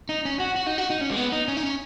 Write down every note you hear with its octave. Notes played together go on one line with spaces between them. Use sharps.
D#4
C#4
F#4
F#4
D#4
F#4
D#4
C#4
G#3
B3
D#4
C#4
D#4
C#4